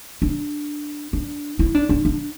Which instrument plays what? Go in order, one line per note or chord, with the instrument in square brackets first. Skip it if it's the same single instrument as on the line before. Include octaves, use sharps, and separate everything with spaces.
[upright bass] D4
D4
E4
D4
D4
D4